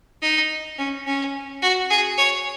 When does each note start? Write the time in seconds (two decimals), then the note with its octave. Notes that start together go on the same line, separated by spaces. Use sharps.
0.22 D#4
0.78 C#4
1.06 C#4
1.62 F#4
1.90 G#4
2.18 C#5